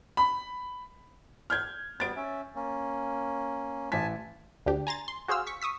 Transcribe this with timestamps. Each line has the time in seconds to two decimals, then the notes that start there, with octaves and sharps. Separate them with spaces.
0.17 B5
1.50 F6 G6 G#6
2.00 G3 B3 A6 D7
2.16 C#4 E5
2.55 A#3 C#4
3.92 A1 G#5 A5 B6
4.66 D2 D4 G4
4.87 G#5 A#5 C6 A6
5.08 C6
5.28 F#4 G#4 C5 F5 E6 F6
5.47 C#6 B6
5.62 C#6 D#6 E6 B6